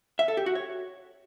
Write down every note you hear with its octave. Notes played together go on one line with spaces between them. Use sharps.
E5
A4
G4
F#4
C#5